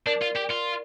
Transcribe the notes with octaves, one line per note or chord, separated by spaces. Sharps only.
D4 A#4 D5
F4
G4
F4